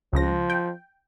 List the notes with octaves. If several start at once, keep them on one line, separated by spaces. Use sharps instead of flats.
C#2 C#3 F3 A#6
G5